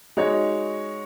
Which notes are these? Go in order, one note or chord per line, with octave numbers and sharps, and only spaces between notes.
G#3 D#4 F#4 C#5